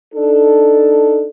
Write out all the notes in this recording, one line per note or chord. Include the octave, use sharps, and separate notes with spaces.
D4 D#4 A4